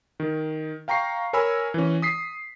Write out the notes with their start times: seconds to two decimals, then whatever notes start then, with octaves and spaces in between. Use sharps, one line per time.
0.20 D#3
0.88 F5 G5 A#5 C#6 C7
1.33 A#4 C#5 G#5 B5 E6
1.74 E3 C#4
2.02 D#6 B6 C7